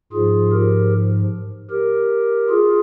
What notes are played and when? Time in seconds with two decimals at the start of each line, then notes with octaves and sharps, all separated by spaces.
0.13 G#2 F3 F4 G#4
0.52 G4 A#4
1.70 G4 A#4
2.49 F4 G#4